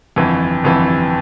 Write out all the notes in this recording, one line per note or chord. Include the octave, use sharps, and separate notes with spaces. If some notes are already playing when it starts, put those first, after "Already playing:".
G1 F2 E3
G1 F2 E3